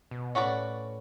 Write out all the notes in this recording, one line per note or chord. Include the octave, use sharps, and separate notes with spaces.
B2
A2 C#4 F#4 B4 D5